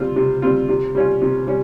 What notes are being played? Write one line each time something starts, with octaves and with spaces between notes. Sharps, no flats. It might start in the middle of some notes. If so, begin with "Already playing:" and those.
Already playing: C3 G3 C4 F4
C3
G3 C4 F4
C3
G3 C#4 F4
C3
G3 C#4